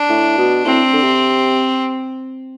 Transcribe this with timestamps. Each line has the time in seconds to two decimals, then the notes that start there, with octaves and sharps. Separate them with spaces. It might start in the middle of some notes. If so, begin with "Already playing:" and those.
Already playing: D4
0.10 A2
0.38 B2
0.65 A2 C4
0.94 D3
1.02 C3